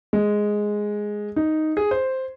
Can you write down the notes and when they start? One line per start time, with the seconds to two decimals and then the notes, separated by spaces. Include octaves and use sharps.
0.13 G#3
1.36 D#4
1.77 G#4
1.91 C5